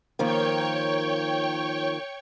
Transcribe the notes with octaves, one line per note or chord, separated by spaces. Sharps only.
D#3 F3 A#3 C#5 G5 C#6